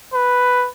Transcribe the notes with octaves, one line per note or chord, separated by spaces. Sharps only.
B4